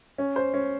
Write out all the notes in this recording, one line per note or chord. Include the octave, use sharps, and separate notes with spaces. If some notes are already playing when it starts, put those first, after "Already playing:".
C#4
C5
C#4